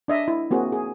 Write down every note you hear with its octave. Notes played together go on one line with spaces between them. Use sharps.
D4 D#5 E5
E4
A#3 C4 F#4 G#4
G#4